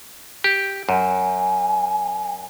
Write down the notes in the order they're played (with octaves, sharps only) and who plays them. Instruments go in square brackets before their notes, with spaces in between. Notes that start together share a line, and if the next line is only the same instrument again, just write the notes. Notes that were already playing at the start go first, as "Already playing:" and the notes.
[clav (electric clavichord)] G4
[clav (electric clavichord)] F#2 [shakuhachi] G#5